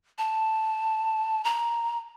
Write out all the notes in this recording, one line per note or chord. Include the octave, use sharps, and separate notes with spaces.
A5
A#5